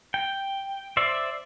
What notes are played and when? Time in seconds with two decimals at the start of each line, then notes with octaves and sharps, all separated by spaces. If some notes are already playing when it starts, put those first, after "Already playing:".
0.14 G5
0.97 C5 D5 E5